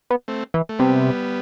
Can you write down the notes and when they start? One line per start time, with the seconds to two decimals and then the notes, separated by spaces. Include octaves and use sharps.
0.10 B3
0.28 A3 C4
0.54 E3
0.69 A3
0.79 C3 G3 B3